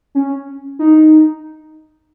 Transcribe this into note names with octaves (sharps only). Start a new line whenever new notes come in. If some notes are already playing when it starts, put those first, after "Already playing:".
C#4
D#4